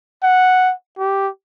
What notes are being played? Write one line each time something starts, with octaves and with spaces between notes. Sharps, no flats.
F#5
G4